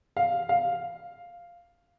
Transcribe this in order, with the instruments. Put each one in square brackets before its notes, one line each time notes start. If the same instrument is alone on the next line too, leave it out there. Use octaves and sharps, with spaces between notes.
[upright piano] F5
F5